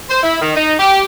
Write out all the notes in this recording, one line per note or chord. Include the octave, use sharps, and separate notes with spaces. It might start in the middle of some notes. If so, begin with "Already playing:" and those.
C5
E4
D#3
D#4
G4